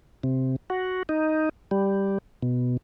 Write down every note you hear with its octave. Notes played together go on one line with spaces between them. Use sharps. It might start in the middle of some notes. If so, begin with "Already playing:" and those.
C3
F#4
D#4
G3
B2